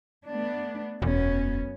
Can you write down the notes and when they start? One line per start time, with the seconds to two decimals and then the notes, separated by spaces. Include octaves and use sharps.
0.25 A3 B3 D4
1.02 E1 F#2 B3 C#4